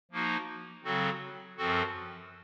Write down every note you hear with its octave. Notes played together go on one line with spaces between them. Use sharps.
F3 A#3 D#4 F#4
C#3 F#3 C4 F#4 A4
F#2 F3 C4 F#4 A4